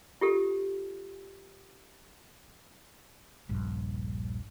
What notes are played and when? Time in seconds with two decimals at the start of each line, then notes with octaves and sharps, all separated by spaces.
0.21 F4 G4 A4
3.49 D#1 A#1 G2